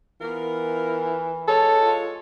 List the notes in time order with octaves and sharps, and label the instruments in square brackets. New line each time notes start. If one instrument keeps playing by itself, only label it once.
[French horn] E3 [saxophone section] B3 F4 A#4
[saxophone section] G#3 C#5 [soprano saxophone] A4
[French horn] F4